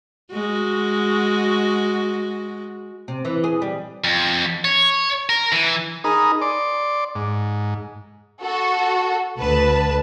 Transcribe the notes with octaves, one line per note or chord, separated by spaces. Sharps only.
G#3 F#4
C3
E3
G#4
G3
F2
C#5
A#4
E3
D#4 G#4 A#4 A#5 B5 D#6
D5 C6 D6
G#2
F#4 A4
D2 B4 A5